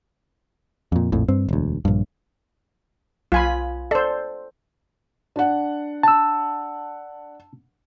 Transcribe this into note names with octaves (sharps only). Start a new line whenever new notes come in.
F2 A#2
A#1 F2 A2
G2 C4
E1 D2
A#1 G2
B1 F4 G#5 B5
A4 C5 D5
D4 F#5
A5 E6